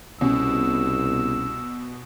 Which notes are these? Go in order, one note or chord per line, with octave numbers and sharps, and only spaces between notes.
C2 B2 C#4 E6